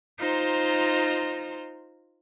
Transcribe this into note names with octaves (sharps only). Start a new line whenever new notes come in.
D#4 F4 C5 A#5